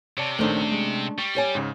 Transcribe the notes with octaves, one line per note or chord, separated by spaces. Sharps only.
C3 C#5 D5 A5
A#1 D#3 A3 C#4 D4 C5
G#3
G3 C#6
G4 C#5 G#5
G#2 C#3